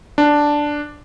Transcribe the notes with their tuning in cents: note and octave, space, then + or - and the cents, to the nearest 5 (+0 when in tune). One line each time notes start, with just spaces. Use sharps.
D4 +0